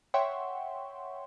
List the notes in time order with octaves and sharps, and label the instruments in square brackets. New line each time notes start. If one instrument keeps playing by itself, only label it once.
[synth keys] C#5 E5 F#5 G5 C6 C#6